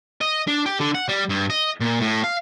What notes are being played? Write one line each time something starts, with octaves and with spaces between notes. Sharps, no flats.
D#5
D4
G4
D3
F#5
G3
G2
D#5
A#2
A2
F5